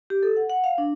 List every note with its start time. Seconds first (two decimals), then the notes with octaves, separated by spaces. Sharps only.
0.10 G4
0.23 A4
0.37 F#5
0.50 F#5
0.64 F5
0.78 D4